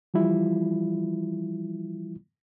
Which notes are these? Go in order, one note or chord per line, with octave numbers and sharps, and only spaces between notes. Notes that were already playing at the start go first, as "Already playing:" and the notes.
E3 F3 G3 E4 F4